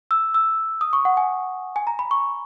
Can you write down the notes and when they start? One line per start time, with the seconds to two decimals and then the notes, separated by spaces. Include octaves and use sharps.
0.11 E6
0.34 E6
0.81 D#6
0.93 C#6
1.05 F#5
1.17 G#5
1.76 G#5
1.87 A#5
1.99 B5
2.11 C#6